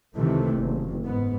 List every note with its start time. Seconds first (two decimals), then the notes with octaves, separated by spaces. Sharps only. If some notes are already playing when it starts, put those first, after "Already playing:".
0.16 C#2 C3 D#3 E3 A3
0.53 F#1
1.04 G#2 B3